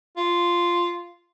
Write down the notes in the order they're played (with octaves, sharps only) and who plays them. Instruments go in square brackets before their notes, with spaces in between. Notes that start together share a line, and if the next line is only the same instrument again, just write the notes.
[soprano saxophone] F4